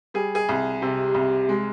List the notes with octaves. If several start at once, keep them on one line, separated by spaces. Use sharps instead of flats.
G3 G#4
G#4
C2
C3
C2
G#3